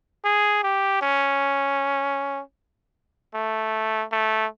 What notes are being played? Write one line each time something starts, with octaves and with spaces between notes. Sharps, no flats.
G#4
G4
C#4
A3
A3